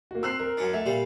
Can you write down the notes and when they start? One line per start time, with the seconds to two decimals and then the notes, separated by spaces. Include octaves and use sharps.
0.11 A#3 F#4
0.23 C4 E6 F#6 C7
0.39 A#4
0.57 F#2 C#4 D4
0.74 A3 E5
0.86 A#2 G3 F5